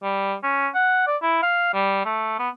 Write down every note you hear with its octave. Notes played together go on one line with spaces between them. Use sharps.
G3
C#4
F#5
D5
E4
F5
G3
A3
B3